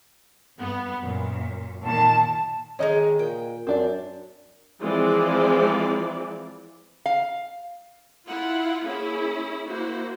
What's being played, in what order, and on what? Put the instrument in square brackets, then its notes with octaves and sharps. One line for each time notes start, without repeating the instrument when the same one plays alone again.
[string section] G2 B3
F#2 A#2
[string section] A#2 D#3 [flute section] A5
[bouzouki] D3 D#3 G#3 [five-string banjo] C#5 D#5
[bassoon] A#2 [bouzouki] G5
[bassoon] F#2 [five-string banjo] C4 D4 D5
[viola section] E3 F3 G#3 C4 D5
[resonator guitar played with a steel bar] F5
[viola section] E4 F4 F#5
A#3 C#4 E4 G#4
A#3 E4 F#4 C5